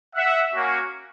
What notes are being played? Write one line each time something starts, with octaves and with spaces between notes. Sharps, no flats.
E5 F#5
A#3 C#4 F#4